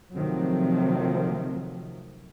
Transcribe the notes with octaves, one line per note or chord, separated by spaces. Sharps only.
C3 D#3 F3 F#3 A3 C4